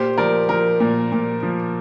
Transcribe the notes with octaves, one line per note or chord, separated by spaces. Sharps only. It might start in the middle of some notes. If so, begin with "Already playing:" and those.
Already playing: A#2 G4 C5
F3 A#4 D5
F3 A#4
A#2
A#2
F3